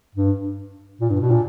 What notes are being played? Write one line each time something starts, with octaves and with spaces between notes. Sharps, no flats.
G2
A#2
G2
B2
A#2